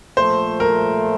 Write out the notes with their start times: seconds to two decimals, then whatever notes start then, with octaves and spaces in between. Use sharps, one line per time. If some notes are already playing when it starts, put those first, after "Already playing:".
0.17 A#2 F3 A3 C5
0.60 A#4